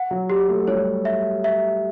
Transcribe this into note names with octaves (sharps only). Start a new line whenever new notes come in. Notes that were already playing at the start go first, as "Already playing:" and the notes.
Already playing: F#5
F#3
G4
A3
G3 C#5
E5
E5